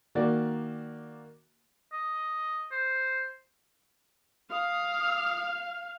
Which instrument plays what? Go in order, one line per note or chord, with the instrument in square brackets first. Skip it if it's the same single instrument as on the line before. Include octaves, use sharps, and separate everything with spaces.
[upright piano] D#3 A#3 F#4 D5
[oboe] D#5
C5
[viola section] F5 [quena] D#6